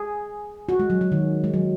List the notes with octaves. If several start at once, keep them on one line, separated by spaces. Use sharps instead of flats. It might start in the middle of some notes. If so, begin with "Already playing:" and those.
Already playing: G#4
F#4
G#3
F#3
F#3
D#3
G#3
F#3